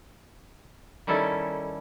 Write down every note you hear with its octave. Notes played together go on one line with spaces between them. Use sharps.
D#3 G3 C#4 E4 A4